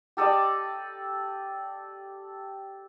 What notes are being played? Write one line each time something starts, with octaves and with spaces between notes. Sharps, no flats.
G4 A4 D5 D#5